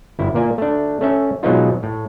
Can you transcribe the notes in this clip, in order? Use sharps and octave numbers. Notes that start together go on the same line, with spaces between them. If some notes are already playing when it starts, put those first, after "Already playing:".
G1 E4
A#2 A#3 D5 G#5
A3 D4
A3 C#4 E5
B2 F#3 G#3 B3 D#4 F4
A2